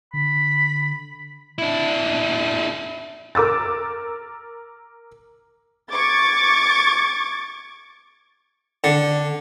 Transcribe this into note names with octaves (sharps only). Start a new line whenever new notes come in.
D3 B5
D4 E4
A#4 D6 E6 A6
C#6 D6 G#6 A6
D3